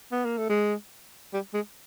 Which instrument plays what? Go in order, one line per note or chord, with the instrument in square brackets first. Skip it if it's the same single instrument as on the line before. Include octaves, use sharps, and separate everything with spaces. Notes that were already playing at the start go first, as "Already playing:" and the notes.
[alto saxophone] B3
A#3
A3
G#3
G3
G#3